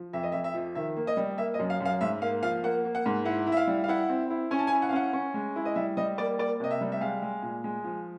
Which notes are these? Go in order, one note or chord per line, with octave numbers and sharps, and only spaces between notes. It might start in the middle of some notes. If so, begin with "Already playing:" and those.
Already playing: F3
F2 E5
D#5
F2 E5
E5
F3
D#3 E5
A#3
D#5
G3
A#3 E5
D#5
F#2
F5
F#2
F5
G#2 E5
A#3 F5
F3 F5
A#3 F#5
A#3
F#5
G#2
E4 F#5
E4
E5
F5
G3
F5
E4 F#5
C4
E4
C#4 G#5
A5
G#5
E4
F#5
F5
C#4 F#5
C#4
G#3
E4
D#5
G3 E5
G3 D#5
A#3 D5
A#3 D5
C3 D#5
E5
G3
E5
G#3 F5
G#3
A#2
G#3
F3